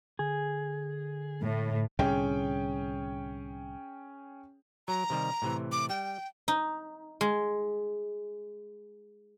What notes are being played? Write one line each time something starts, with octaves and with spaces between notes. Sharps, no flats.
D3 G#4
A2
C2 A2 D3 C#4 G#4 G5
F#3 A#5
C3 D#3 G3
A2 C3 E3
D6
G3 G5
D#4
G#3